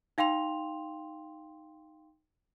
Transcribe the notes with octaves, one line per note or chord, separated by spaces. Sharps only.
D#4 F5 G5 C6 F7